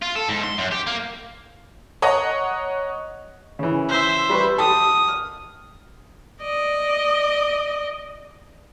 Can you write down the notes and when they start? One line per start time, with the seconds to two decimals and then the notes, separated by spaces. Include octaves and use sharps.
0.02 F4
0.15 A4
0.29 G#2
0.44 C6
0.58 F#2
0.71 G4
0.86 A#3
2.02 C#5 D#5 F#5 A#5 C#6
3.59 C#3 E3
3.89 C5 E5
4.30 G3 B4 C#6
4.58 G4 A4 D#6
5.08 F6
6.42 D5 D#5